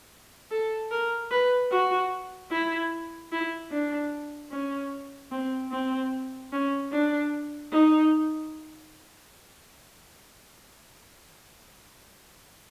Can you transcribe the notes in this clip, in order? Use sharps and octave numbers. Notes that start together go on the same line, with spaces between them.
A4
A#4
B4
F#4
E4
E4
D4
C#4
C4
C4
C#4
D4
D#4